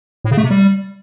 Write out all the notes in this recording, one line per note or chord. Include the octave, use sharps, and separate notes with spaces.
A2
C#3
A3
C3
G3